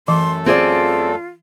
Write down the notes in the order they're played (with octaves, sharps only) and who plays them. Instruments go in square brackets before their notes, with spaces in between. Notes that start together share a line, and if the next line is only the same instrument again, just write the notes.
[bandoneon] F#2 A3 A4 [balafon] E3 [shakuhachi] C6
[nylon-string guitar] C4 G#4 D5 [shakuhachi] F4